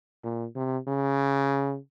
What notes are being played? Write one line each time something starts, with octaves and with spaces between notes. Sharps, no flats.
A#2
C3
C#3